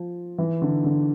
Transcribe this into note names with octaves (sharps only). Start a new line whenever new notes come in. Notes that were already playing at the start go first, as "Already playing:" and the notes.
Already playing: F3
E3
D3
D3